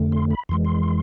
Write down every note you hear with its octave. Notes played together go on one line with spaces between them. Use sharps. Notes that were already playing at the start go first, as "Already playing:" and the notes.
Already playing: F2 D3 A3
C6
B5
F2 E3 G#3 C6
C6